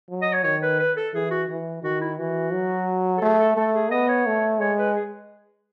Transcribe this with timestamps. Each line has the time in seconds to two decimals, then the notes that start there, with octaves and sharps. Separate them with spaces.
0.10 F#3
0.22 D#5
0.33 C#5
0.44 D#3 C#5
0.63 B4
0.79 B4
0.97 A4
1.14 E3 G#4
1.31 F#4
1.49 E3
1.83 D#3 F#4
2.01 E4
2.19 E3 F#4
2.53 F#3
3.18 A4
3.22 A3 G#4
3.39 A4
3.57 A3 A4
3.75 G#4
3.91 B3 D#5
4.08 C#5
4.27 A3
4.60 G#3 C#5
4.78 B4
4.96 G#4